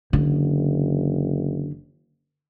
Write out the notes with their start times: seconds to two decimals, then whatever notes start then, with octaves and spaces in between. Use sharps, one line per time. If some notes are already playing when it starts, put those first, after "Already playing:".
0.13 F#1 D3